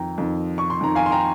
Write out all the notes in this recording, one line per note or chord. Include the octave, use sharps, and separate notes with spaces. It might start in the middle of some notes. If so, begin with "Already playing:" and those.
Already playing: F2 D#3 G5 A#5
F2 D#3
C#6
C6
F2 D#3 A#5
F5 G#5
C6
G5 A#5